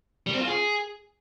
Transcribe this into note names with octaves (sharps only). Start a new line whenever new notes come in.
G3
C4
F4
G#4